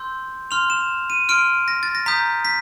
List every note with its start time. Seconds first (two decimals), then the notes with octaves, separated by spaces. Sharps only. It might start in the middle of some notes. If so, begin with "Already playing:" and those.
Already playing: C6 E6 G6
0.51 C6 F6 F7
0.70 E7
1.10 D#7
1.29 C6 F6 D7
1.68 A#6
1.83 A6
1.95 A#6
2.06 A#5 D#6 G6 B6
2.45 B6